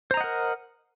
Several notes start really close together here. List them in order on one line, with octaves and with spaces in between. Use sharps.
C5 A#5 D#5 F#5 A#4